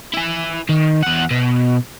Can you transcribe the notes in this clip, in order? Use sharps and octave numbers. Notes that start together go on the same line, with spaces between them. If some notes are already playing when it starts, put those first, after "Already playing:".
E4 G#5
D#3
E2 F#5
B2